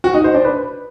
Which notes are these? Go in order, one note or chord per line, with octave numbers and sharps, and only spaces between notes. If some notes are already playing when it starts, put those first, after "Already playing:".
F#4
D#4
C5
D4
B4